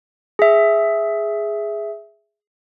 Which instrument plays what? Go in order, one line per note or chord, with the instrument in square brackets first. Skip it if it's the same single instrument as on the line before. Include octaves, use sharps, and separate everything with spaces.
[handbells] G#4 E5